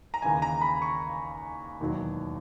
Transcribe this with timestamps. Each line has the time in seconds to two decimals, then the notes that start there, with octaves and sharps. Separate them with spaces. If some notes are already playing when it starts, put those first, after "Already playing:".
0.14 A#5
0.22 D#2 C#3 E3 G#5
0.42 A#5
0.61 B5
0.82 C#6
1.80 E1 D#2 D#3 F#3